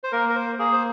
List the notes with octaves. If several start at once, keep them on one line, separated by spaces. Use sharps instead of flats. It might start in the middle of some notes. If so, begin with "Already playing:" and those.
C5
A#3 A#4
A#4
C5
A#3 G#4
C5